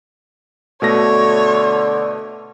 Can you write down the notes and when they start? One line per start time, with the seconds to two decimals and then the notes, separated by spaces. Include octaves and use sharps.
0.82 B2 D3 A3 C#5 A#6